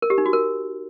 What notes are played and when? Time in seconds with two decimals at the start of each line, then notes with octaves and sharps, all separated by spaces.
0.02 A#4
0.10 G4
0.18 D#4
0.26 F#4
0.33 A#4